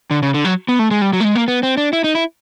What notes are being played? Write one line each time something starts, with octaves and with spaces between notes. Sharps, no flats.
D3
C#3
D3
F#3
B3
A3
G#3
G3
F#3
A3
G#3
A#3
B3
C4
D4
E4
D#4
E4